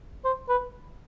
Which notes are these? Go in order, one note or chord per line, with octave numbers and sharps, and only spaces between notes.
C5
B4